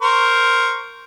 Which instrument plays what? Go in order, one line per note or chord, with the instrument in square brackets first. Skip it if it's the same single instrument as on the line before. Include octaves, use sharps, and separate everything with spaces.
[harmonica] A#4 C5 C#6